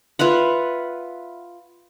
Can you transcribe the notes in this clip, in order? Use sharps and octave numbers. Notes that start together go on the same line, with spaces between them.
F4 B4 E5 F#5